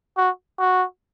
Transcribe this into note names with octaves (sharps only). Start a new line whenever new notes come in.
F#4
F#4